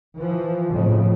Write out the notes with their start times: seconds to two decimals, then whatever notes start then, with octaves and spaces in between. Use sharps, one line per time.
0.17 E3 F3
0.73 F2 A2 C#3